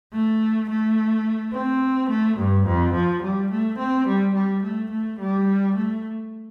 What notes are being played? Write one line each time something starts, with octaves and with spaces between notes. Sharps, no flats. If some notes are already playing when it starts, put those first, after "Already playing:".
A3
A3
C4
A3
G2
F2
F3
G3
A3
C4
G3
G3
A3
A3
G3
A3